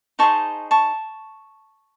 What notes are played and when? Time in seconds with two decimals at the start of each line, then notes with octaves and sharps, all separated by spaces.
0.19 D#4 G#4 C5 D#5 A5 C#6
0.71 A5 C#6